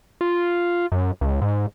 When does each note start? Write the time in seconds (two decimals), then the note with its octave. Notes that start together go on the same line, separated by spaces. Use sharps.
0.21 F4
0.92 F#2
1.21 C#2
1.41 G#2